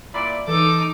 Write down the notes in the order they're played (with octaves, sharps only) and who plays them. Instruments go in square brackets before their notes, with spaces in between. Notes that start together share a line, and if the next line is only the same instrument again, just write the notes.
[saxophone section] A#2 E4 D5 [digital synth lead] B5
[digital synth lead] E3 [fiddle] D#4 D6 [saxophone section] A4